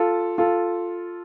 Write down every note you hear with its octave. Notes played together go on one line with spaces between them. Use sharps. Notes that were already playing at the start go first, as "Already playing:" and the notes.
Already playing: F4 A4
F4 A4